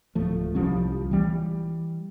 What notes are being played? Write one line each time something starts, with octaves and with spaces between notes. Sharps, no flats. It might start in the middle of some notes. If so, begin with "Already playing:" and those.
D1 F3 A3
C2 F3 G3 C#4
E3 G3